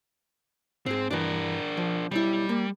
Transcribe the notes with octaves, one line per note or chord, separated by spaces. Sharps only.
G#2 C4 G#4
G2 E3 D4 A#4
F3
B1 G3 E4
A#3